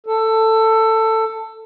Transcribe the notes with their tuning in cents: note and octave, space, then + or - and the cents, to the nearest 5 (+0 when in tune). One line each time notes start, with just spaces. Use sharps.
A4 +15